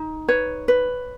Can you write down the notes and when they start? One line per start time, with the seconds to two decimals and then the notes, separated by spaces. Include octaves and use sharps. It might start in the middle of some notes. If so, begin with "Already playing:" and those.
Already playing: D#4
0.28 B4 C#5
0.68 B4